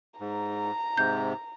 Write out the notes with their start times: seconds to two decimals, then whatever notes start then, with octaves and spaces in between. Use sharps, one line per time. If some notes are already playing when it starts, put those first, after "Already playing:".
0.20 G#2 A#5
0.97 G#2 C3 G6